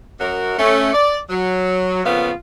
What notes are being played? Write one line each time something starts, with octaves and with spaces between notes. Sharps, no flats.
F#2 F#4 A#4
A3 C#4
D5
F#3
F2 A#2 C#3 B3 F4 F5